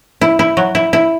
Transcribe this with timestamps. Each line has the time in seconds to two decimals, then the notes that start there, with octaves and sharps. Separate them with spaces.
0.21 E4
0.39 E4
0.57 F#3
0.75 E4
0.93 E4